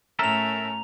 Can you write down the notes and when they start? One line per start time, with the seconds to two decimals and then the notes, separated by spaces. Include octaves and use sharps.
0.19 A2 A3 C#4 A4 A#4 E5 A#5 F7